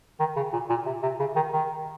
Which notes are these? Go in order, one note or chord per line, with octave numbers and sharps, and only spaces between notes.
D#3
C#3
A#2
A#2
C3
C3
C#3
D#3
D#3